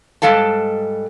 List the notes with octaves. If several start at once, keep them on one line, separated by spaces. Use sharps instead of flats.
G#2 G3 G#3 A4 F5 A5